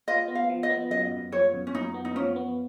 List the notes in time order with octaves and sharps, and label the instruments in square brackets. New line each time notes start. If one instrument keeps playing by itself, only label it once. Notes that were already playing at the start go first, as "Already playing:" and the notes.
[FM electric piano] F4 [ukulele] D#5
[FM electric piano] B3
[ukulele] F5
[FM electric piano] F3
[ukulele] D#5
[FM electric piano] B3
[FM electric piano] F#2 [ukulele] D#5
[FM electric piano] F#2
[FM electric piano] F3 [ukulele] C#5
[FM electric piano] F#2
[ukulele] C#4
[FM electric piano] F#2 [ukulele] D#4
[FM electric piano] B3
[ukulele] D#4
[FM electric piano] F3 [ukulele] C#4
[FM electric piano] B3